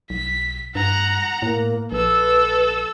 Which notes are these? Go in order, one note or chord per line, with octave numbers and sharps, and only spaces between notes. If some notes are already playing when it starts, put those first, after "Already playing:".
B1 B6
G2 F#5 A#5
A2 A#3
A#1 A4 B4 E6